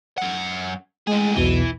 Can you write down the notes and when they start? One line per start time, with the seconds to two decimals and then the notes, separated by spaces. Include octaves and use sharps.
0.18 F#2 F#5
1.07 A2 G#3 G#4
1.36 B1 E2 B2 E3